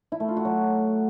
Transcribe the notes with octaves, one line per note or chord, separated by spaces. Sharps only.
E4
A3
F4
F#4
F#3